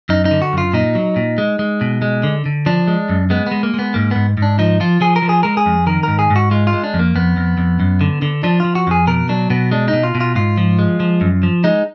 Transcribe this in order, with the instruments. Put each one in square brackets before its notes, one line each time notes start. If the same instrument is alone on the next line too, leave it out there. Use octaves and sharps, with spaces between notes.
[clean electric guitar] F#2 D#4
D#4
D3
F#4
F#2 F4
A#2 D#4
F#3
A#2
G#3
G#3
B2
G#3
D3
D3
F3 D4
G#3
F#2
G#3 B3
G#3 B3
A#3
G#3 B3
G#2 A#3
G#2 B3
G#2
D4
F3 D#4
F3 F4
F3 G#4
A#4
F3
G#4
G#3 A#4
G#4
F2
D#3 A#4
G#2 A#4
G#4
G#2
F#4
G#3 F4
F4
G#3
D4
F2
A#3
F2 B3
F2
F2
F#2
D3
D3
F3 D4
F3 F4
F#4
F2 G#4
B2 A#4
F#3 D4
B2 B3
G#3 D4
D#4
B2
F4
B2
F4
G#2 F4
F3
G#3
F3
F#2
F3
G#3 D#4